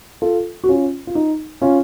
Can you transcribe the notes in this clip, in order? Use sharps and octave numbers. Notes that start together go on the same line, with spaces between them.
F4 A4
F#4
C#4 F4
F4
D#4
C#4 F4